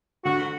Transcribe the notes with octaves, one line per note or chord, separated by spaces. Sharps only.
D3 F#4